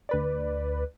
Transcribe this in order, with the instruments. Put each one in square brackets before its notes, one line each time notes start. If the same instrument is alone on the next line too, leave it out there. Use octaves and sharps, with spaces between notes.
[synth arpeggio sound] D2 B4 D5